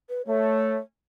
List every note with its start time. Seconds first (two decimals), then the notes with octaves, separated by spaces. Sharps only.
0.09 B4
0.27 A3 C#5